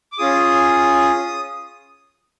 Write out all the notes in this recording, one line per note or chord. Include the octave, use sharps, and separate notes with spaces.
D6
C#4 F4 G#4 D#6